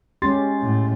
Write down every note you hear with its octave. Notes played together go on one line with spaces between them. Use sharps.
G#3 C#4 G4 C6 A6
A2